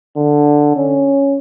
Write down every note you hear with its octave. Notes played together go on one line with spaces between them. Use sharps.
D3
C#4